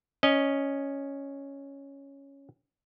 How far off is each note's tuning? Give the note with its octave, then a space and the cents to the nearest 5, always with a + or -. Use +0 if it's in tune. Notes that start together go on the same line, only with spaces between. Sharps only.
C#4 +0 D#5 -10